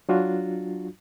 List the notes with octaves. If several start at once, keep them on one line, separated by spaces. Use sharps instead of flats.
F#3 D4 F4 F#4